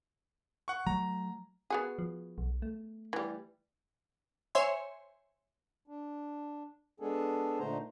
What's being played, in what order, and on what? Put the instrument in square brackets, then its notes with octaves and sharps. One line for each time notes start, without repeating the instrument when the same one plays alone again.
[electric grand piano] F#5 C#6
[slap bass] F#3 A3 [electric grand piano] A#5
[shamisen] B3 F#4 G#4
[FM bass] F3
B1
A3
[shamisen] E3 G3
[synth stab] C5 C#5 E5 G#5 C6
[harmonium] D4
G#3 B3 D4 G#4 A4
A#2 D3 A3 D#4 C5 A#5